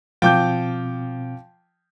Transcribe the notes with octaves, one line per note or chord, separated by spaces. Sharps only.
B2 F3 C4 G5 D6 G6